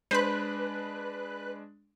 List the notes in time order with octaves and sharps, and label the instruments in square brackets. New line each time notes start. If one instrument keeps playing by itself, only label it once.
[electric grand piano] G#3 D4 [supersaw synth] B4 F#6 [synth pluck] C5 B5